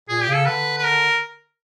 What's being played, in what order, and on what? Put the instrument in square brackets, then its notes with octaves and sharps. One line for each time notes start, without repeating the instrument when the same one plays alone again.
[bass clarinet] A#2 [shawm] G#4
[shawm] G4
[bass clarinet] C#3
[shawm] A4
[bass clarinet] D3 [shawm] B4
[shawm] B4
A#4